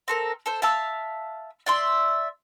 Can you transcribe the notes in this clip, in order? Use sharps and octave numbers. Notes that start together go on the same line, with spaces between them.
C4 A4 A#4
A4 C5
E5 F5 A5 E6
D5 E5 C6